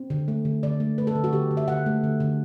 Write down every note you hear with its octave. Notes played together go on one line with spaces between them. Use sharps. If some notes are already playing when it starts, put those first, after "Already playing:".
Already playing: C4
D3
A3
D3
D3 D5
A3
A3 B4
A4
D3
F#4
D3 G4
D3
E5
D3 F#5
A3
D3
D3